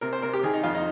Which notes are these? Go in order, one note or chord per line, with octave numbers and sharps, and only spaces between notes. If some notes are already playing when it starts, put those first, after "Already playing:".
C3 A#4
C5
C3 A#4
G4
D#3 G#4
D#4
F2 F4
D#4